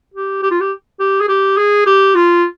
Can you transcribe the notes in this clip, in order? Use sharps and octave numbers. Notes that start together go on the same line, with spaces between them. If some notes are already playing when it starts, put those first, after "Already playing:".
G4
G4
F4
G4
G4
G#4
G4
G#4
G4
F4